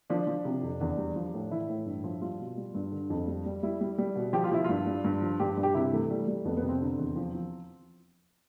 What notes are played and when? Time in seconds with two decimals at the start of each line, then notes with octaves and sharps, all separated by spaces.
0.10 F3 D4
0.27 F3
0.45 C3
0.63 F2
0.80 E2 D4
0.98 G3
1.16 F3
1.33 A2
1.51 E3 E4
1.69 A2
1.86 G2
2.04 F3
2.22 G3 F4
2.39 B2
2.57 G3
2.75 G2
2.92 D3
3.10 F2
3.27 G3
3.46 G3
3.63 G3 E4
3.81 G3
3.98 G3
4.16 B2
4.33 F3 G4
4.44 F4
4.51 F3 E4
4.64 G2 F4
4.86 G3
5.04 G2
5.21 F3
5.40 G2 G4
5.57 G2
5.63 G4
5.74 C3 E4
5.92 E3 A3
6.11 G3
6.28 G3
6.45 F2 B3
6.57 B3
6.62 C3
6.69 C4
6.81 D3
6.99 E2
7.16 F3
7.34 F3